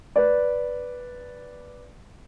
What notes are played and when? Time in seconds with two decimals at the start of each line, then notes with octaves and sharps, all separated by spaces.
0.16 B4 D5